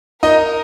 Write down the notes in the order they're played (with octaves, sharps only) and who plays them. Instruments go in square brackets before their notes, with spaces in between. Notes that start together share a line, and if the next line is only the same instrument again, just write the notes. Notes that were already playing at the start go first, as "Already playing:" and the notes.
[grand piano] D#4 D#5 [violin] A#4